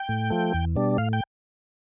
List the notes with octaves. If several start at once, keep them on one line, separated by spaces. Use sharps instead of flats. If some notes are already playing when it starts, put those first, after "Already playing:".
Already playing: G5
A2
F3 A3
E2
B2 G3 D4
A2 F5
G5